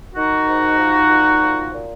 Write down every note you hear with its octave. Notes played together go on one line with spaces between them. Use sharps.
D#3 D#4 F#4
G#2
F3
A#2
F3
A#2